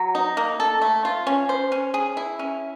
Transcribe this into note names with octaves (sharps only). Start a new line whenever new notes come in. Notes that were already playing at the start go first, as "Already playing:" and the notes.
Already playing: F#3
D#4
A#3
A4
A3
F4
C#4
C5
C#4
G#4
E4
C#4